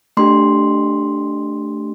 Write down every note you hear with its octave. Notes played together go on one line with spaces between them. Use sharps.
A3 D4 G4 C6